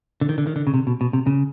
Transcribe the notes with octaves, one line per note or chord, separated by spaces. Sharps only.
D3
D#3
D3
D#3
D3
C#3
C3
B2
B2
C3
C#3